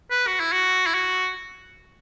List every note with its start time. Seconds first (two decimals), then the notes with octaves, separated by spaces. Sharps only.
0.11 B4
0.27 F#4
0.40 E4
0.52 F#4
0.86 E4
0.94 F#4